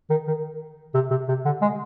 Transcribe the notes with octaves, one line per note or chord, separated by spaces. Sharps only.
D#3
D#3
C3
C3
C3
D3
G#3